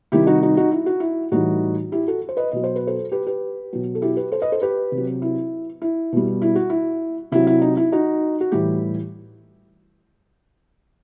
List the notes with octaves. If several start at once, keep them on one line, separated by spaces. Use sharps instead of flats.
C3 D#3 G3 E4 G4
D#4 F#4
D#4 F#4
D#4 F#4
E4
F#4
E4
A2 E3 G3 D#4 F#4
E4 G4
F#4 A4
C5
B4 D#5
B2 F#3 D#5
C5
B4
A4 C5
G4 B4
G4 B4
B2 F#3
A4
E4 G4
G4 B4
A4 C5
B4 D#5
A4 C5
G4 B4
C3
F#3
E4
E4
B2 G3
E4
F#4
E4
C3 F#3 E4
E4
D#4
E4
D#4 F#4
F#4
A2 E3 G3 E4 G4